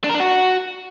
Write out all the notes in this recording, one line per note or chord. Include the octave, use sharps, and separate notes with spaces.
D4
A#4
D4
F#4